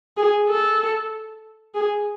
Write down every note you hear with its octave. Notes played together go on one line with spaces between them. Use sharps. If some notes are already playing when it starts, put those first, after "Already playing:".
G#4
A4
G#4